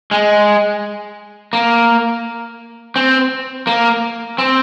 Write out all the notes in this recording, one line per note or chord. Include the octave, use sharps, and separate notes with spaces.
G#3
A#3
C4
A#3
C4